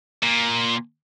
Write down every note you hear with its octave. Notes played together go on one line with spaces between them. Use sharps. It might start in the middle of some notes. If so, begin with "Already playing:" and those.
A#2